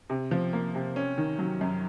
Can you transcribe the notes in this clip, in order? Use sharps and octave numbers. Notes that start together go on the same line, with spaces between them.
C3
F3
A#3
C3
C#4
D#3
F#3
F#2